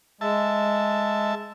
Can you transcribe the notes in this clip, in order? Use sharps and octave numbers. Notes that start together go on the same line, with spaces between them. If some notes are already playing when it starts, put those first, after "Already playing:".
G#3 E5 A5